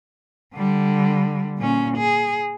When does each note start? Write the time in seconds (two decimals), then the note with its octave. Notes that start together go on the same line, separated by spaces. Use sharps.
0.55 D3 G3
1.58 A#2 C#4
1.98 G#4